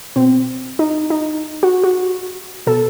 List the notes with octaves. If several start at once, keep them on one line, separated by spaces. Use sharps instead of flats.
B2 C4
D#4
D#4
F#4
F#4
B2 A4